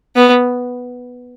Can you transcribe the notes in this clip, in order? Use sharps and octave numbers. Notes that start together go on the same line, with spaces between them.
B3